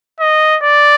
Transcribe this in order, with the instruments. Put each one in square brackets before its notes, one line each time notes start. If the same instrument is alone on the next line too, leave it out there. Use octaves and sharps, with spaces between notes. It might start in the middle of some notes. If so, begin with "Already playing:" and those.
[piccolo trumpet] D#5
D5